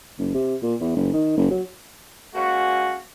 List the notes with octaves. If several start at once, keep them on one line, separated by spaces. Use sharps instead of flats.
F#1
C3
A#2
E2
F#1
D#3
F#1
F#3
G#3 A#3 C#4 F#4